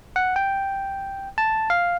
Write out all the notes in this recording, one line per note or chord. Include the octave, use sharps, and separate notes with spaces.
F#5
G5
A5
F5